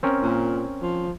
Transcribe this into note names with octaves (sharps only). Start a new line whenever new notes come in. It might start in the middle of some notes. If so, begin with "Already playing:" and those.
C4 C#4 A#4
A#2
F3